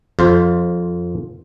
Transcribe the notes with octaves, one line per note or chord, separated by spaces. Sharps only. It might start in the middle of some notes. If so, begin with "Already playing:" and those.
F2 F4 C5